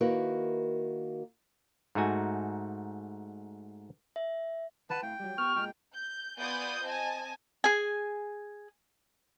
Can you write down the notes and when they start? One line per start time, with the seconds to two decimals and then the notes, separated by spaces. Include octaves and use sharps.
0.01 D#3 A#3 E4 F#4 A#4 B4
1.95 G#2 A3 D#4 F#4 G#5
4.16 E5
4.90 D#3 B4 F#5 A5
5.03 A2 F5 G5
5.20 F#3 G3
5.38 B3 G4 C#6 F6
5.56 A#2 G#3 G5
5.96 G6
6.38 B3 F4 D5 G#5 D#6 G6
6.83 C4 D#5 G#5 A5
7.64 G#4 G#5